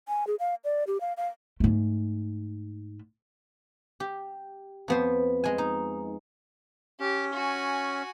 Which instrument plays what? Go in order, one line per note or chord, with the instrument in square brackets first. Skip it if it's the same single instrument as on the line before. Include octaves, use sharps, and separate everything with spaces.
[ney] G#5
G#4
F5
D5
G4
F5
F5
[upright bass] G#2 A3
[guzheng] G4
F2 B3 C5
G#3 G#5
D#4
[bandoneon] C#4 [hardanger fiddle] G4
[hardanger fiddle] F#4 G#5